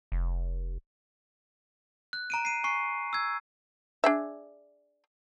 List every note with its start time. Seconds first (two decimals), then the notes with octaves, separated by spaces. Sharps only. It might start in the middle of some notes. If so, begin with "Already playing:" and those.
0.12 F1
2.13 F#6
2.30 A#5 D7 D#7
2.45 C7 D#7
2.64 G#5 C#6 C7
3.13 E6 G#6
4.04 D4 G#4 E5